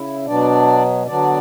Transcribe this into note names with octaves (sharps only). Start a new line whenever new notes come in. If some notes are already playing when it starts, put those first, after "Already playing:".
Already playing: C#3 E4
B2 F#3 B3 D4 D5
D3 F#3 B3 D4 D5